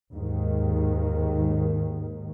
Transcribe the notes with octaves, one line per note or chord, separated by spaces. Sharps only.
D#2 G#2 D#3